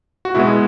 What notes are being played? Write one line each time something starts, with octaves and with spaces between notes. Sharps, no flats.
F#4
B2 G#3 B3 E4